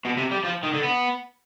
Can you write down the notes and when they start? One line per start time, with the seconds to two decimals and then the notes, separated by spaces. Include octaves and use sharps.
0.05 B2
0.17 C3
0.31 G3
0.44 F3
0.63 D#3
0.73 D3
0.83 B3